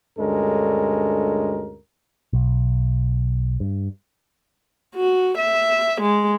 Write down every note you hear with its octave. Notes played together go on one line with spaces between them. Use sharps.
D2 G2 G#3 C#4 A4 A#4
B1
G2
F#4
E5
G#3